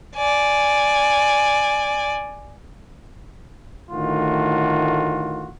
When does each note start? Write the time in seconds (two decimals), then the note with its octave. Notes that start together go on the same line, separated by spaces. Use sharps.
0.15 D5 G#5
3.91 D2 A2 D#3 F4 F#4